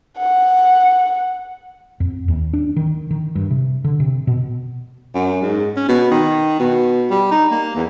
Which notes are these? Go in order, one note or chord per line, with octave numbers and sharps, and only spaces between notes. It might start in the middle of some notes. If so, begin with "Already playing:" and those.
F#5
F2
D#2
D4
D#3
D#3
G2
C3
D3
C3
B2
F#2
G#2
C#4
B2
D#3
B2
G3
D#4
A#3
E2